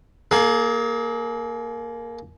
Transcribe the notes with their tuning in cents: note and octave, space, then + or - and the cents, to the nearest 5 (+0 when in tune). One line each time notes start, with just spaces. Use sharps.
A#3 +0 G#4 +40